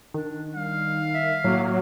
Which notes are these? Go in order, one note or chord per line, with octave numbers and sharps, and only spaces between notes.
D#3 D4
G3 F5
E5
A2 F#3 A#3